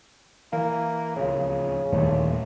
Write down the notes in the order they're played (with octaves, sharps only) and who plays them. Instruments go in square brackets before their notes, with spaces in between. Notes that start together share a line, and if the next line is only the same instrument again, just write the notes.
[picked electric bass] E3 [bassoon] A#3
[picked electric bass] D1 C#2 F3 [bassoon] C#3
[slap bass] D#1 D#2 A#2 [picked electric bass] A1 A3